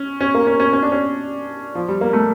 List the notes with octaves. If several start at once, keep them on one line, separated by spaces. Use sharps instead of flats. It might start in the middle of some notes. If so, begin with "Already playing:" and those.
Already playing: C#4
C#4
A#3
C#4
C#4
C#4
D4
C#4
F3
G3
A#3
A3